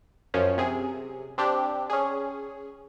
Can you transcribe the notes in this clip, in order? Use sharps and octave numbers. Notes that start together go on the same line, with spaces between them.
F#2 F3 C#4
C3 G#4
C4 D4 G4
C#4 G#4